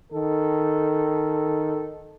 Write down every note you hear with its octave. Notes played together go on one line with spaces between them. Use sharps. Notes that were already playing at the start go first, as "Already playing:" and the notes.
D#3 A4